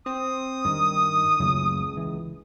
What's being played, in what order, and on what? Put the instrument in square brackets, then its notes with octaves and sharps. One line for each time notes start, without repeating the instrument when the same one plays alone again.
[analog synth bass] C4 [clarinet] D#6
[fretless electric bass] G2 [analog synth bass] D#3
[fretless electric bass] F#1 F#3 A3 [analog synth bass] C#2
[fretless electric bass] E3